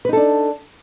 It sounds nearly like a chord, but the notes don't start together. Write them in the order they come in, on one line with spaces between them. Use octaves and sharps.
B4 D#4 A4 D4